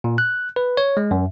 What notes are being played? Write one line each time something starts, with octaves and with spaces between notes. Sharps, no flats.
A#2
F#6
B4
C#5
G#3
F#2